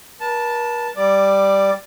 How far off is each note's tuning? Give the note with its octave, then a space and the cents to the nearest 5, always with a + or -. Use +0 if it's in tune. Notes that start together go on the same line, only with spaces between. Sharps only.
A#4 +45 A5 +0
G3 +0 D5 +0 D6 +15